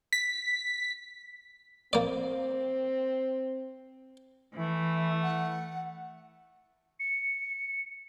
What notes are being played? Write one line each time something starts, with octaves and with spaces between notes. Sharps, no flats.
B6
A#3 C4 D5
E3 A3
F#5
C#7